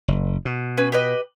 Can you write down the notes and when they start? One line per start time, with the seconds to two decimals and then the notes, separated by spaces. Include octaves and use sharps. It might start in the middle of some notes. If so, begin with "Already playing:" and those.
0.08 F#1
0.45 B2
0.77 C#4 B4
0.92 G4 B4 D#5